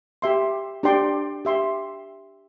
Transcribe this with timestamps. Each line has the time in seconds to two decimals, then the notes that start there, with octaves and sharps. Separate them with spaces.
0.22 G4 E5 C6
0.83 D4 G4 D5 G5 C6
1.45 G4 E5 C6